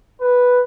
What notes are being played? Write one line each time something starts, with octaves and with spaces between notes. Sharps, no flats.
B4